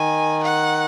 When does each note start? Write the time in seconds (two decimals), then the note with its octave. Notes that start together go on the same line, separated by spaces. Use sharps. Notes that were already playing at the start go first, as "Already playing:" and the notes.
Already playing: D#3 G#5
0.43 F#5